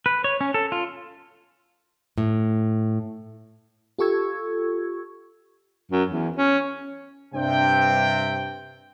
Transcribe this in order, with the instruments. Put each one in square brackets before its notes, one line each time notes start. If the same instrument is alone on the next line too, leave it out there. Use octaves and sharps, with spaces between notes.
[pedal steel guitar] B4
C#5
C#4
A4
F4
[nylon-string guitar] A2
[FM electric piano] F4 G4 A4 C#6 E6 G#6
[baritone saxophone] F#2
E2
C#4
[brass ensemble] G2 C3 G5